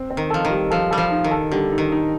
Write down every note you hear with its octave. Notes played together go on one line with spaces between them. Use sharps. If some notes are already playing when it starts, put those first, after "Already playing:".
Already playing: C4
C4
D#3
F3 A4
D#3
G3
F3 A4
G3 A4
F3
D#4
D#3
A4
D3 G3
D#4
D#3
D#4